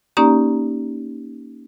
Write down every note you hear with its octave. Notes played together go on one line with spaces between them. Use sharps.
A#3 C#4 D#4 G4 D5 A#5